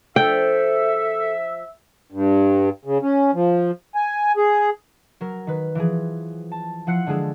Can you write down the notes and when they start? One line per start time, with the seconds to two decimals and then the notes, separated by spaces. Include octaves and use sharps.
0.16 F3 D4 A4 E5 G5
2.12 G2
2.85 C#3
3.02 C#4
3.34 F3
3.95 G#5
4.37 G#4
5.21 F#3 A#4
5.47 D#3 B4
5.75 E3 F3 G#4
6.52 A5
6.87 F3 E4 F#5 F#6 C7 C#7
7.07 D3 F3 G#3 G#4 A4